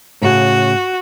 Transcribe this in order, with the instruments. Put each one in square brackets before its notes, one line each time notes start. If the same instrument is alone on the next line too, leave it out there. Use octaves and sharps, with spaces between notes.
[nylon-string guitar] A2 C#3 [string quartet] F#4